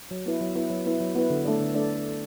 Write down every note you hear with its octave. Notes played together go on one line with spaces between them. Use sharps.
F#3
B3 E4 B4
F#3
B3 E4 B4
F#3
B3 E4 B4
F#3
B3 E4 B4
D3
A3 D4 A4 D5
D3
A3 D4 A4 D5